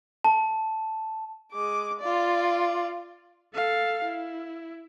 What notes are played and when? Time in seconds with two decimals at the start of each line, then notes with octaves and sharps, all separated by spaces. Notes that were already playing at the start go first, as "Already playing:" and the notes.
0.24 A5
1.53 G#3 D6
2.00 F4 D5
3.54 A4 F5
4.05 E4